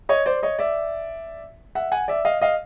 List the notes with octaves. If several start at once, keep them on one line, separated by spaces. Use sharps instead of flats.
C#5 D#5
C5 D5
C#5 D#5
D5 E5
E5 F#5
F#5 G#5
D5 E5
D#5 F5
D#5 F5